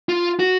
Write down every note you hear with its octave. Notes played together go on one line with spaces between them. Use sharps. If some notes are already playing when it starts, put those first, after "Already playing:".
F4
F#4